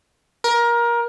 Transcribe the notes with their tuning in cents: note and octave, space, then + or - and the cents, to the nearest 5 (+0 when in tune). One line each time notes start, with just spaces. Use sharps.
A#4 +20